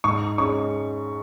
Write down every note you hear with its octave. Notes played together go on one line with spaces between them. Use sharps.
G#2 C#6
G#3 C#4 C#6